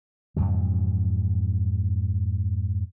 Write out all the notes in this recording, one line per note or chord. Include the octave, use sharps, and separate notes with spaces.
F2 G#2 C#3 F#3